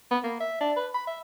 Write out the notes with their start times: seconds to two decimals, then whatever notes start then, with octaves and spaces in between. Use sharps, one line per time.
0.11 B3
0.24 A#3
0.40 E5
0.61 D4
0.76 B4
0.94 B5
1.07 E5